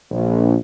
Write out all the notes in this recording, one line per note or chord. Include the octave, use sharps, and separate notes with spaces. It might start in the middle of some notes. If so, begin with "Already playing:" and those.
A#1